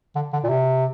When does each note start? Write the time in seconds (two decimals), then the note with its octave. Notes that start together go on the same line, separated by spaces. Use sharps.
0.15 D3
0.33 D3
0.44 A#2
0.49 C3